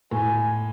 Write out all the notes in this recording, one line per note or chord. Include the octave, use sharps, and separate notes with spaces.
A2 G#5